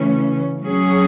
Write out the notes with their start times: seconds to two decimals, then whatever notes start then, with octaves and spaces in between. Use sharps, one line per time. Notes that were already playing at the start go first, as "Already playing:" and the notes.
Already playing: C#3 E3 A3 C#4
0.62 F#3 C#4 G#4